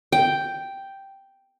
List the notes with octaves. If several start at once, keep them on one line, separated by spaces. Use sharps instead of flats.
G5